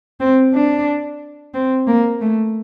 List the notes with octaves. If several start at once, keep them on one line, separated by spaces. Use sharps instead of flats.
C4
D4
C4
A#3
A3